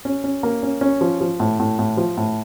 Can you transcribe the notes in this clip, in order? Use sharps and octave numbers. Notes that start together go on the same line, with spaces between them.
C#4
C#4
A#3
C#4
C#4
F3
F3
A2
A2
A2
F3
A2